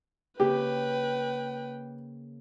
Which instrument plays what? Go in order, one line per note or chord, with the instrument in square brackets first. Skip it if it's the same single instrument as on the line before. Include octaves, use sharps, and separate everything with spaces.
[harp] C#3 A#3 [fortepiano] G4 [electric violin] B4 G5